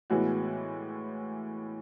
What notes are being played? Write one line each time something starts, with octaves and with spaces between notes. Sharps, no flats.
A2 E3 G#3 B3 F#4